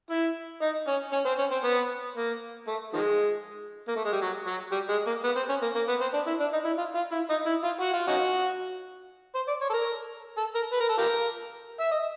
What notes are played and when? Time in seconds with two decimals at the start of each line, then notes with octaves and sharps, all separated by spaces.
0.10 E4
0.62 D#4
0.88 C#4
1.13 C#4
1.26 C4
1.39 C#4
1.52 C4
1.64 B3
2.16 A#3
2.68 A3
2.93 D#3 F3 G#3
3.88 A#3
3.96 A3
4.05 G#3
4.13 G3
4.22 F#3
4.47 F#3
4.72 G3
4.90 G#3
5.07 A#3
5.24 B3
5.36 C4
5.49 C#4
5.63 A#3
5.76 A#3
5.89 B3
6.01 C4
6.14 D4
6.27 E4
6.40 D4
6.53 D#4
6.65 E4
6.78 F4
6.95 F4
7.12 E4
7.30 D#4
7.46 E4
7.64 F4
7.81 F#4
7.94 F4
8.08 C#4 D#4 F#4
9.35 C5
9.48 D5
9.61 C#5
9.70 A4
9.73 A#4
10.38 A4
10.55 A#4
10.73 B4
10.81 A#4
10.89 A4
10.98 F4 G4 A#4
11.80 E5
11.91 D#5